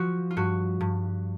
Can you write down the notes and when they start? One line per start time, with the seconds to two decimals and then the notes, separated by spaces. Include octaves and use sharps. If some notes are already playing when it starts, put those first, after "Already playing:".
Already playing: F3 F#4
0.31 F4
0.37 G2 F#4
0.81 G2